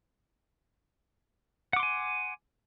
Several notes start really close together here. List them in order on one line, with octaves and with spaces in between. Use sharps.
F#5 D6 C6 G#5